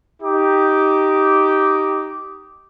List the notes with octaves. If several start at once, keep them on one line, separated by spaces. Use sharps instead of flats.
D#4 G4 D6